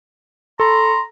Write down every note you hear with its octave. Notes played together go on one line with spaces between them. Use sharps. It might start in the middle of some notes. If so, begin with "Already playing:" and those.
A4 A#5 C6